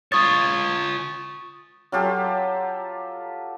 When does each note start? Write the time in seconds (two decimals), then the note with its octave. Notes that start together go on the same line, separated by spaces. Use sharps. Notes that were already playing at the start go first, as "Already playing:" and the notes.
0.12 F4 C#5 C#6 D#6 A6
1.92 F#3 F4 G4 A4